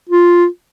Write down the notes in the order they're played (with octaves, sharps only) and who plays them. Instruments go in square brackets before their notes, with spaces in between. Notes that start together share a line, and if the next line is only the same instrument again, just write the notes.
[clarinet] F4